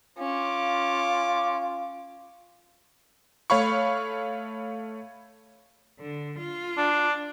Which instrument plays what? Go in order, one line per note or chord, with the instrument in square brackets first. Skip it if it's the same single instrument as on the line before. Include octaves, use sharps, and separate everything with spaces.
[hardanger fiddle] C#4 [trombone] F4 [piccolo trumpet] D6
[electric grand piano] A3 C#5 F5 B5 C#6
[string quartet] D3
F4
[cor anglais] D4